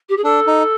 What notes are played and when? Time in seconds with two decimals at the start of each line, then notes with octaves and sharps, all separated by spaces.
0.09 G4
0.17 G#4
0.24 D4 A4
0.47 D#4